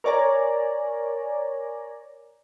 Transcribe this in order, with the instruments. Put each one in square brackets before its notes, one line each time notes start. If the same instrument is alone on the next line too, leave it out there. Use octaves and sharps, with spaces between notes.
[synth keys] A#4 C#5 D5 G#5 A#5